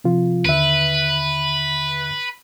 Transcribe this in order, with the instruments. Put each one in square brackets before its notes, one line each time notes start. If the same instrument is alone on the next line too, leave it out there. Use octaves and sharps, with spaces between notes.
[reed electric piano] C3 F3 F4
[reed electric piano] D#2 D3 E5 [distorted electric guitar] B4